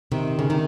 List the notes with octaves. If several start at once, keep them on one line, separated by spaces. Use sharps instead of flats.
C3 D#3
C#3
C3 D#3